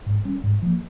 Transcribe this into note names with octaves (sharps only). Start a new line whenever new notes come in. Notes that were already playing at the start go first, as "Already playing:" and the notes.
G#2
G3 C#4
G#2
F3 A#3